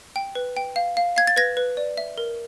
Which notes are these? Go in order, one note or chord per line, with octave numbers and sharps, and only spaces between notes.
G5
B4
G5
F5
F5
F5 G#6
A6
B4 G#6 A#6
B4
D5
E5
A#4